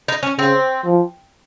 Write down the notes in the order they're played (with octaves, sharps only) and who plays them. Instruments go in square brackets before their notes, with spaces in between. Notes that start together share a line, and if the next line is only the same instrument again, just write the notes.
[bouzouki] D#4
C#4
[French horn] C#3 [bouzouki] C4
[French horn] F3